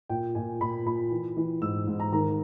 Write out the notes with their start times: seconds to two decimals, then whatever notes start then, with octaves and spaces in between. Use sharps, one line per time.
0.09 A#2 G5
0.35 A#2 G#5
0.61 A#2 B5
0.86 A#2 B5
1.11 E3
1.37 E3
1.62 G#2 E6
1.87 G#2
2.00 A#5
2.13 D#3 A#5